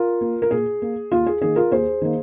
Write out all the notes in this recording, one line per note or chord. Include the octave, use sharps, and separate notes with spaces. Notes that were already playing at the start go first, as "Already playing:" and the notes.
Already playing: F4 A#4
A#3
A#4
A#2 G#4
A#3
D#2 F4
G#4
D#3 A#3 G#4
F4 A#4
D#2 G#4 C5
D#3 A#3